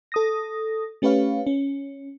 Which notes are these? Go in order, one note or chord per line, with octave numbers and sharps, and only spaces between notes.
A4 D#6 A#6
A3 C#4 G4 B4 C#5 F5
C#4